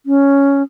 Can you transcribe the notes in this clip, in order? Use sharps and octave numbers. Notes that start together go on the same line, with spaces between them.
C#4